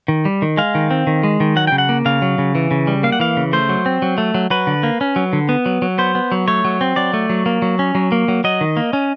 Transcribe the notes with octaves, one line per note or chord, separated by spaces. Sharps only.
D#3
G3
D#3
G#3 F5
D#3
C4
D#3
G#3
D#3
F#3 F#5
C#3 G5
F#5
A#3
C#3 F5
F#3
C#3
E3
C#3
G3
A#3 F5
F#5
E3 F5
C#3
A3 C5
F#3
C4
F#3
A3
F#3
F#3 B4
D3
A#3
C#4
F#3
D3
B3
F#3
F#3
B3 C5
B3
F#3
A3 C#5
F#3
C4
F#3 D5
A3
F#3
A#3
F#3
C#4
F#3
A#3
F#3
F#3 D#5
D#3
A#3
C#4